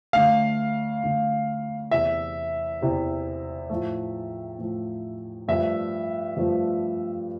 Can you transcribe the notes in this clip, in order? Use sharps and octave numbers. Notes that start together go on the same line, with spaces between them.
D2 D3 A3 F5
D2 D3 A3
E2 C3 E3 E5
E2 C3 E3
A2 F3 A3
A2 F3 A3
G2 F3 A3 E5
G2 F3 A3